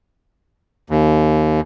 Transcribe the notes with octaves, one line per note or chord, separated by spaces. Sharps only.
D#2